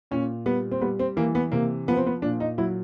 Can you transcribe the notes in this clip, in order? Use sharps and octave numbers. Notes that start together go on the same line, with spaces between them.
A#2 C#4
G3 B3
C4
G3 B3
C4
E3 A#3
B3
C3 A#3
F3 B3
C4
B3
A#2 D4
D#4
F#3 E4